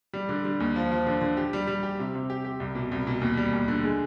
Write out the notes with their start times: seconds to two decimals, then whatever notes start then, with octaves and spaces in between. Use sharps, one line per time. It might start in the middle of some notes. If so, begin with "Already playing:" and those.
0.13 G3
0.29 D3
0.45 G3
0.60 D#2
0.76 F3
0.92 F3
1.07 D3
1.21 D3
1.37 G4
1.53 G3
1.67 G3
1.83 G4
1.99 C3
2.15 C3
2.30 G4
2.45 G4
2.60 C2
2.75 B2
2.92 C2
3.07 B2
3.21 D#2
3.37 G3
3.53 D#2
3.68 D3
3.84 G#3